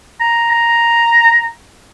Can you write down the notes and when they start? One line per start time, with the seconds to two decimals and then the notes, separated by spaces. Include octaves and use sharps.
0.21 A#5
0.51 A#5